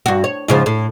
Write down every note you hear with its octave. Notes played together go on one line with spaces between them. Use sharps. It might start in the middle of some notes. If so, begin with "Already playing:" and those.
G2 F#4
C#5
G#2 C#3 F3
A2